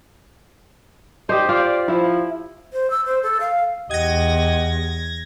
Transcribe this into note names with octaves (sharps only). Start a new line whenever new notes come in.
D#4 G4 C5 D5 D#5
F4 D5
F3 E4
C5
E6
C5
A4
F5
E2 G4 D#5 F#5 G#6 A#6